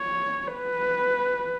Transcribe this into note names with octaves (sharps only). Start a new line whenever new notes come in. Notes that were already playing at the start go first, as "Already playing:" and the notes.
Already playing: C#5
B4